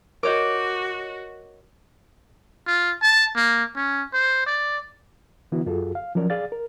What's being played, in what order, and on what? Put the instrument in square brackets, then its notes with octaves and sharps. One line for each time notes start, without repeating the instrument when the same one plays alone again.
[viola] F#4 [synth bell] A#4 C#5 D#5 [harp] D6 G6
[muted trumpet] F4
A5
A#3
C#4
C5
D5
[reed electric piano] D3 E3 B3 E4 F#4
F#2 F4 F#4 G#4 A4
F5
F3 F#3 C#4 A#4 D5
G#4 D5 F5 A6
A#4